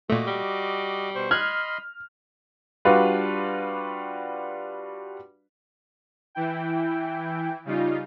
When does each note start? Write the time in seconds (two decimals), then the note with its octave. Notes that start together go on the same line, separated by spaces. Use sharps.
0.10 A#2 A3 F#4 D#5 D6
0.27 G3
1.15 B2 C5 C#6
1.31 D#5 B5 C6 F6 F#6 G#6
2.85 G3 D4 F4 F#4 B4
6.35 E3 E4 G5
7.65 C#3 G3 D#4 F4